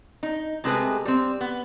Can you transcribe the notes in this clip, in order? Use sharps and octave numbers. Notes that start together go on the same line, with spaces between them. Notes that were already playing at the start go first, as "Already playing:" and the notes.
D#4
C3 G#3 A3 C4 G#4 B4
G3 C4
B3